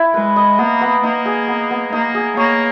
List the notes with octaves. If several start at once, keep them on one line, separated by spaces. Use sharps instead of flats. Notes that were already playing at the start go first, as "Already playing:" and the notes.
Already playing: E4
G#3 B4
D#5
A#3 B3
B3
A#3 D#4
G#4
B3
B3
A#3 D#4
G#4
A#3 C#5